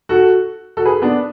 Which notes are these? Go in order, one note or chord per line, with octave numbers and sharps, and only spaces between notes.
F#4 A4
F#4 A4
G#4 B4
B3 D4